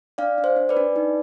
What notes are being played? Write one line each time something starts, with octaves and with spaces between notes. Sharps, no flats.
D4 D5 F5
D4
C5
D4
B4 D5
D4
D#4